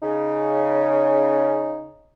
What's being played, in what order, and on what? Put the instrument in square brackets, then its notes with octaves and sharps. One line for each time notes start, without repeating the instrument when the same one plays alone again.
[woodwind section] C#3 [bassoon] D#4